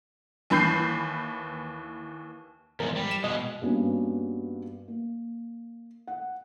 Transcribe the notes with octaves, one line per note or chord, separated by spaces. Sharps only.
D#2 E3 B5 G6 C7
E2 G#2 A#4
G3
E7
B2 G#3 D#5
G2 A#3 B3 C#4 F#4
A#3
F#5